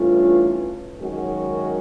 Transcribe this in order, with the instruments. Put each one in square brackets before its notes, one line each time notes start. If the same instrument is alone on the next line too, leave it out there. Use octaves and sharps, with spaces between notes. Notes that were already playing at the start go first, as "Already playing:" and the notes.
Already playing: [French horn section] G2 E3 A3 C#4 F4
F#2 D#3 G#3 C#4 F#4